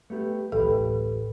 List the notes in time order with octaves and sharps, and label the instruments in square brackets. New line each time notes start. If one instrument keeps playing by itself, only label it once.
[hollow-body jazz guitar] A3 B3 G4
[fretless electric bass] D1 A1 [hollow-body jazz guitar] G4 B4 [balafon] A4